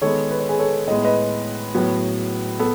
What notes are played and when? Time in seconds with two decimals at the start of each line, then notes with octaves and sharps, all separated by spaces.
0.01 D#3 G#3 B3 A4 C#5
0.31 B4
0.39 C#5
0.49 G#4 B4
0.59 A4 C#5
0.87 A2 G#3 B3 D#5
1.04 B4 D#5
1.74 A2 F#3 B3
2.59 B3 A4